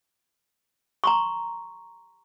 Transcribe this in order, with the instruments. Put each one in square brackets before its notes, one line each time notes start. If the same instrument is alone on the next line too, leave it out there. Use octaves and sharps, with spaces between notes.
[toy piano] A#5 C6 C#6